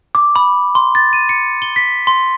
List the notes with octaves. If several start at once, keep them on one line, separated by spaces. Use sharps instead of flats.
D6
B5
C6
A6
D#7
C#7
G7
B6
C6